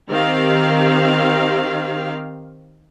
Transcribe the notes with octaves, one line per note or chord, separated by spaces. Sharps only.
D#3 C4 G4 F5